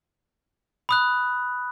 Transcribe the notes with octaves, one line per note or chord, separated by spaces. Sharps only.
B5 D#6 F#6